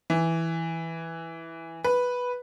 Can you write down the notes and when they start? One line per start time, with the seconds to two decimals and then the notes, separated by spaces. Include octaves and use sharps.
0.10 E3
1.84 B4